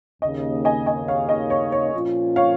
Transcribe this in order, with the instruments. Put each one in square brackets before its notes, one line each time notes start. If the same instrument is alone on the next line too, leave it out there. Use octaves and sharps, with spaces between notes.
[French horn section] D#2 C#3 A#3 [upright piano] D#5
[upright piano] D#5 G#5
D#5 G#5
C#5 F5
D#5
C#5
C#5
[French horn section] A#2 F3 C#4 F4
[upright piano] C#5 F5